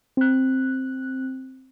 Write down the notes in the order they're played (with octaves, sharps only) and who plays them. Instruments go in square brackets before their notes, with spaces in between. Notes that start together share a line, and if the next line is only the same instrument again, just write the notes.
[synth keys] C4 F#6